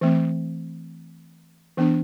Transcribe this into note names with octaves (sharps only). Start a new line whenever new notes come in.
E3 A3 C4
E3 B3 D4